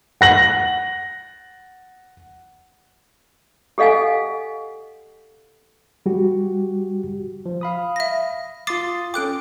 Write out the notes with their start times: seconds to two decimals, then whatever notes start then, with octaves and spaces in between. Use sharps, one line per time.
0.21 F#5 A#6 F#7
3.78 G4 A4 D#5 F5 F#5 G#5
6.06 G3 F#4 G4
7.46 F3
7.61 F5 B5 D#6
7.96 E5 A#6
8.67 F4 C6 D6 D#6 A6 C7
9.14 C#4 A4 G5 D6 F#6 D7